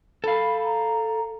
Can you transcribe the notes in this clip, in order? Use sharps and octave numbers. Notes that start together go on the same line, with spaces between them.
A4 F5 B5
A#5